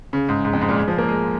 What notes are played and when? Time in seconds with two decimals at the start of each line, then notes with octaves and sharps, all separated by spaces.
0.13 C#3
0.29 G#2
0.45 G#2
0.53 F2
0.61 G#2
0.69 A#2
0.76 G#3
0.88 F3
0.98 A#3
1.08 G#3